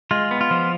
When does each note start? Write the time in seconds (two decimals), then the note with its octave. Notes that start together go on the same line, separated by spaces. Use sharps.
0.11 G#3 F4
0.31 B3
0.41 F4
0.51 F3